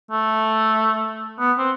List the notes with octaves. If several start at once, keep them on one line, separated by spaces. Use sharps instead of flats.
A3
B3
C4